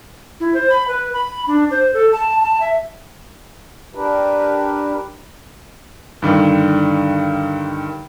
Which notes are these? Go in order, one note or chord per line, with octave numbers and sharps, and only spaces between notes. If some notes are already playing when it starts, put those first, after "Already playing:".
E4
C5
B5
B4
B5
D4
C5
A4
A5
A5
E5
D4 G4 A#4 B4
G2 D3 D#3